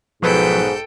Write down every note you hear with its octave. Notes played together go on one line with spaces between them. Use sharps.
B1 G#2 F3 F#3 A4 B4 G5 B5